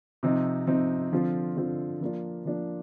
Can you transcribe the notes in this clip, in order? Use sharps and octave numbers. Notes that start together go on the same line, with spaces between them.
C3 F3 C4 D#4
C3 F3 C4 D#4
D3 F3 C4 F4
D3 F3 C4 F4
F3 A#3 D4 F4
F3 A#3 D4 F4